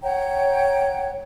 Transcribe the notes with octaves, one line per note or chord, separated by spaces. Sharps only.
C#5 F#5 G5 A#5